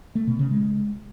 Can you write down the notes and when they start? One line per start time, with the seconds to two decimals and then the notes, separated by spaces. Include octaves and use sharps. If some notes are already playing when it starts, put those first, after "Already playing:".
0.15 A3
0.27 B2
0.39 C#3
0.51 G#3